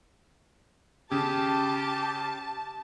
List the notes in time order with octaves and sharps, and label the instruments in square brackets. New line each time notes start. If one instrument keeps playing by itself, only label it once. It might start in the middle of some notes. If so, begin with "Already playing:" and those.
[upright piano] C#3 [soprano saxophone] G4 [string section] A5